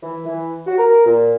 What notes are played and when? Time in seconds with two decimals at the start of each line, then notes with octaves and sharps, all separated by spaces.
0.03 E3
0.26 E3
0.67 F#4
0.78 A#4
1.06 A#2